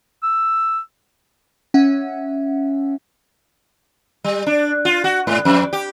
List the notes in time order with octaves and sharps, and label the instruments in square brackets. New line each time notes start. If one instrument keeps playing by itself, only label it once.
[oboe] E6
[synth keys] C#4 E5 F#5
[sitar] G3
D4
F4
F#4
G#2
F2
G4